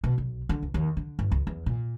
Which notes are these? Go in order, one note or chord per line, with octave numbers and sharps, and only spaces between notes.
B2
B1
D3
C#2
D#2
D3
G1
C#2
E2
A#2